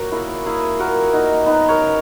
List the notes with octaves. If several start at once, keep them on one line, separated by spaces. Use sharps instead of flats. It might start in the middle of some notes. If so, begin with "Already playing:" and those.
Already playing: A#2 F#4 A#4 C#5 F#5
A#3 E4 G#4
A#3 E4 G#4
A#2 F#4 A#4
A#3 D#4 F#4
F#3 B3 D#4
A#4 C#5
C#3